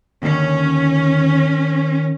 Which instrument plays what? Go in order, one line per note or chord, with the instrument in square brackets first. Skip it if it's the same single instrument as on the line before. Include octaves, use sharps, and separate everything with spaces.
[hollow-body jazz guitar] D#2 D3 [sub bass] D#3 [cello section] C#4